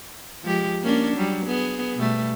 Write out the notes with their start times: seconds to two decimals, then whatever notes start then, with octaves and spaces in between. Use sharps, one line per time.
0.44 F3 G#3 G4
0.82 A#3 C#4 D4
1.16 F#3 G3
1.46 B3 G#4
1.95 B2 G3 A3